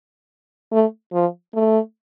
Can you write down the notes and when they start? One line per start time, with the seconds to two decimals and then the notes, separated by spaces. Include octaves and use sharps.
0.72 A3
1.13 F3
1.54 A3